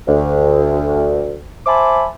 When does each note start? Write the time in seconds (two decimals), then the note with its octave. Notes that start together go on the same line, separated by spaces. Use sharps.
0.07 D2
1.66 C5 E5 G#5 A5 B5 D6